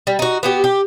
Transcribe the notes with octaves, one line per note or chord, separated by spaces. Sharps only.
G3
D#4 F#4
B3 F#4 G4
G4